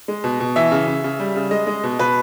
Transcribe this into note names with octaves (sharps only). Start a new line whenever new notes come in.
G#3
B2
B2
E3 E5
C#3
C#3
C#3
G3
C#3
G#3 D#5
G#3
B2
B2 B4